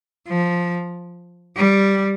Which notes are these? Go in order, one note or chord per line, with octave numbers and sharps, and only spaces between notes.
F3
G3